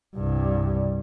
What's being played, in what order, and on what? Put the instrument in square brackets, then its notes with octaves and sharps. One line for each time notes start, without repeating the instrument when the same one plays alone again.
[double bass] C2 G2